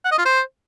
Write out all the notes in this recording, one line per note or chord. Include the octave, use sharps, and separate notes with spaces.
F#5
D#5
F4
C5